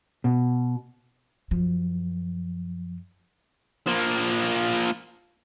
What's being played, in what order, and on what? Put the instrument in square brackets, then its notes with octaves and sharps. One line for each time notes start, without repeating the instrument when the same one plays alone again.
[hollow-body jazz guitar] B2
[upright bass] F#2 F3
[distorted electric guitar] F3 A#3